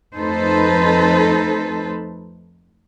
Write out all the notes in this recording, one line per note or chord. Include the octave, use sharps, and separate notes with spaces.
F2 A3 D#4 A4 B4 C5